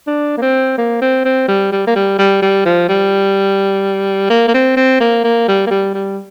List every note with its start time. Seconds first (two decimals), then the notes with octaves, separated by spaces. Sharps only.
0.07 D4
0.37 A#3
0.42 C4
0.78 A#3
1.02 C4
1.25 C4
1.48 G3
1.72 G3
1.87 A#3
1.96 G3
2.19 G3
2.42 G3
2.65 F3
2.89 G3
4.30 A#3
4.48 A#3
4.54 C4
4.77 C4
5.00 A#3
5.24 A#3
5.48 G3
5.66 A#3
5.71 G3
5.94 G3